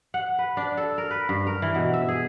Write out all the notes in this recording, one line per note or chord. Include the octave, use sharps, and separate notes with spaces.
F#5
B4
D4
A4
A#4
B4
G2
A#4
E3
B2
E5
G#4